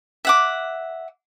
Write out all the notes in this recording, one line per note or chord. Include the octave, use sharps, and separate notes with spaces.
E5 F#5 D6